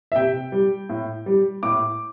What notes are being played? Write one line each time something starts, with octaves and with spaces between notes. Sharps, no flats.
E5
C3 G5
G3
A2
G3
A2 D6